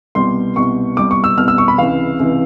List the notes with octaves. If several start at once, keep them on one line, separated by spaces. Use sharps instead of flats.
C2 B2 G3 C6
C2 B2 G3 C#6
C2 B2 G3 D6
C#6
E6
C2 B2 G3 F6
E6
C#6
B5
C#2 C3 E3 F5
C#2 C3 E3